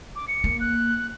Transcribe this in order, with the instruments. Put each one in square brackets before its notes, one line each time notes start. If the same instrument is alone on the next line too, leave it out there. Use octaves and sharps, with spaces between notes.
[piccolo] D6
C#7
[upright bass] A#3
[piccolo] F#6